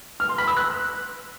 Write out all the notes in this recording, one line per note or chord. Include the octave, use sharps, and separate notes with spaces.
F6
C6
B5
E6
F#6